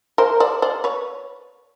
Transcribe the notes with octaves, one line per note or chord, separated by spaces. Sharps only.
A#4 C5
C5 D5
C5 D5
B4 C#5